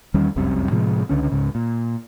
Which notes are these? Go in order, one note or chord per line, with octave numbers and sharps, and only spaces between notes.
E2 D#3 G3 C#4
F1 C2 F#2 C3
A2 C3 F3 G#3
C#2 D3 C#4
C#2 G#2 C#3
A#2